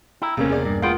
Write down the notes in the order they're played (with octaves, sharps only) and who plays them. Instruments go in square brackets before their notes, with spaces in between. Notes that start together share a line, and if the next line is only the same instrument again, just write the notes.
[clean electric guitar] E4 [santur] G5 A#5
[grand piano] E1 A#3 [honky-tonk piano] C#2 [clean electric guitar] C3 C4 C#4
[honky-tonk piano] G#4 D5
[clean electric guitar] G2
[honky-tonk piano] G#3 [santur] B3 F4 [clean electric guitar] F5 G5